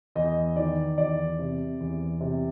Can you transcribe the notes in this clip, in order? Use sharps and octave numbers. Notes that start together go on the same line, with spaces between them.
E2 D#5
D#3 D5
E2 D5
C3
E2
C3